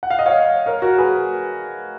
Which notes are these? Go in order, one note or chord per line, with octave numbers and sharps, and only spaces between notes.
F#5
F5
D#5
C#5 F5
A#4 C#5
F#4 A#4
G#4 B4